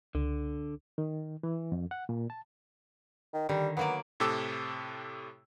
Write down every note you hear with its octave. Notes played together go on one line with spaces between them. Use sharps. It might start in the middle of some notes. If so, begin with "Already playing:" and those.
C#2 D3
D#3
E3
F2
F#5
A#2
A5
D#3
D3 D#3 G3
F#3 A#3 B3 D5
A2 C3 G4 A4 D6 E6